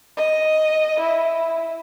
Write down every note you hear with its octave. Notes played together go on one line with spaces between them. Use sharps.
D#5
E4